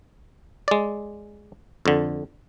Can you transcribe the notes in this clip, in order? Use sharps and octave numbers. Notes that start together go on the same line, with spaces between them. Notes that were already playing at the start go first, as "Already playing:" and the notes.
G#3 D5
F2 D3